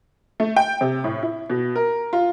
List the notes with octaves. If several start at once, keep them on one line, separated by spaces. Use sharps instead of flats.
A3
G5
C3
A2
E4
B2
A#4
F4